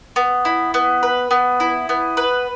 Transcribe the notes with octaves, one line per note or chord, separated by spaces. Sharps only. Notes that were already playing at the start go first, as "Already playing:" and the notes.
B3
E4
B3
B4
B3
E4
B3
B4